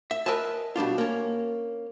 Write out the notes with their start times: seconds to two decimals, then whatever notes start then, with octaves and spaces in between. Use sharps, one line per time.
0.11 E5
0.26 A#4 B4 D#5 E5 G#5 A5
0.76 B2 G3 D4 F4
0.98 A#3 C#4